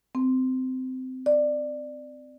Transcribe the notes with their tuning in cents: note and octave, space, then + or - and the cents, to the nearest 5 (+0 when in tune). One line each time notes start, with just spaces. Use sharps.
C4 -20
D5 +15